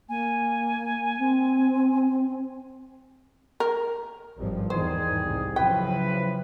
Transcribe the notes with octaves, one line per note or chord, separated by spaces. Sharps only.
A#3 G#5
C4
A#4
G#1 G2 F3
E2 G#2 D#3 G3 G#4 C5
C2 G#2
C#3 F3 F#3 E4 B4 G5